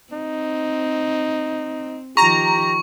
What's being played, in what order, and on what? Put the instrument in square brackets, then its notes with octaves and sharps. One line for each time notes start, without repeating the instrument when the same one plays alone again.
[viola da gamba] C4 [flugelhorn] D#4
[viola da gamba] D#3 F3 [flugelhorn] G4 [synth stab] A#5 A#6 [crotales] C#6